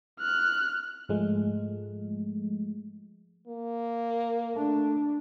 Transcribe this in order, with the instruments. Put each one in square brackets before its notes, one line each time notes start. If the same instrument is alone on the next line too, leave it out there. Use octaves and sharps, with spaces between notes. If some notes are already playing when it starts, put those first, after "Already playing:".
[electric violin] F6 F#6
[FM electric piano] G#2 F3 G#3 A3
[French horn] A#3
[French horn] A3 [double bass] D4